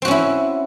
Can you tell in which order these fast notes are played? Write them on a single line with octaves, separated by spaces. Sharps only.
C4 F#4 C#4 E4